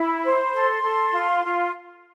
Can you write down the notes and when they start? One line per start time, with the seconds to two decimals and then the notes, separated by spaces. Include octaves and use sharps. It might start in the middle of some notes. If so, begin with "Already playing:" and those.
Already playing: E4 B5
0.24 C5
0.54 A4 C6
0.83 A4
1.13 F4
1.44 F4